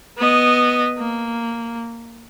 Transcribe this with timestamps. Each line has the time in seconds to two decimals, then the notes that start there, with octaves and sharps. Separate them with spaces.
0.18 B3 D#5
0.99 A#3